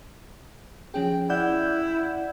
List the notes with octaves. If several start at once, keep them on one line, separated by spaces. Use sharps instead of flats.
F3 C#4 G#4 G5
E4 D5 F#5 G6